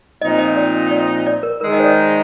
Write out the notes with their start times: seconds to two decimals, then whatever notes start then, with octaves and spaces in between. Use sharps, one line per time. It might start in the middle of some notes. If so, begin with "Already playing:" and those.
0.22 A#2 F3 C4 D#4 D#5
0.39 D#5
0.56 D5
0.91 D5
1.27 D5
1.43 A#4
1.61 D#3 G#3 D#4 A#4
1.73 D#5
1.80 C5
1.84 D5